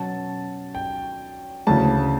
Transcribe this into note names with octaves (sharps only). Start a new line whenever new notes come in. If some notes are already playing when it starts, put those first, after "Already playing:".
Already playing: B2 F#3 C#4 A5
G5
D2 C#3 E3 A5